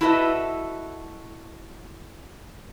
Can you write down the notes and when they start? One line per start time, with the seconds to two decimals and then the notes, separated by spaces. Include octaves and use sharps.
0.01 E4 F#4 A4 B4 D#5 E5